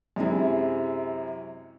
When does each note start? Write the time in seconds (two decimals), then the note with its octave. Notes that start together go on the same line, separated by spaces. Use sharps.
0.16 F#2 C3 G#3 E4